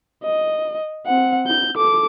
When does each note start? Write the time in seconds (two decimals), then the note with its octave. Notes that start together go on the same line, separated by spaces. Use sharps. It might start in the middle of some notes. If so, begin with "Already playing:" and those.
0.24 D#5
1.06 C4 F#5
1.47 G6
1.76 A4 D6